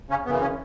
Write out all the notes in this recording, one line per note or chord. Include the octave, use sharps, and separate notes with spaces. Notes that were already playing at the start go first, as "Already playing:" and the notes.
C#3 C#4
F#2 C#3 E3 B3
C#3 C#4